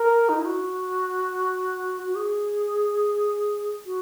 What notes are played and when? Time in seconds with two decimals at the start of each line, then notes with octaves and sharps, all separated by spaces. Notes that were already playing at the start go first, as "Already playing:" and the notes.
Already playing: A#4
0.29 D#4
0.37 E4
0.45 F#4
2.05 F#4
2.16 G#4
3.86 F#4